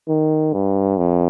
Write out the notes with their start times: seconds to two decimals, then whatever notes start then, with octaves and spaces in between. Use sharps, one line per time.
0.08 D#3
0.53 G2
0.98 F2